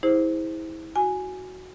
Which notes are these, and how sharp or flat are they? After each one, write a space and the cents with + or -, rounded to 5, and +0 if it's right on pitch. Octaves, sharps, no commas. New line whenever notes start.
E4 -30 G#4 -25 C5 +0
F#4 +0 G#5 +0